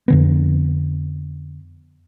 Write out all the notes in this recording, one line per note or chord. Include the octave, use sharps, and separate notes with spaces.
F2 D3 B3